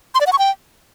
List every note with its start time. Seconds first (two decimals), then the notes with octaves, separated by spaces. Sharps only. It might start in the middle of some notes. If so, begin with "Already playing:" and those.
0.15 C6
0.21 D5
0.27 F#5
0.33 C#6
0.39 G5